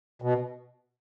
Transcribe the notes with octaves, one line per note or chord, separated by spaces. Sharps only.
B2